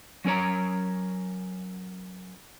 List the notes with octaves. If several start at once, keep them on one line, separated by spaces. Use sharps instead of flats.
F#3 C#4 A#4 C#5 A#5